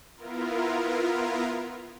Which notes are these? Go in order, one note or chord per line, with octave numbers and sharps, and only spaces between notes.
B3 E4 F4 A#4